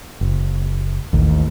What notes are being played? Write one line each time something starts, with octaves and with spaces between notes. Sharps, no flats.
F#1
A1 D#2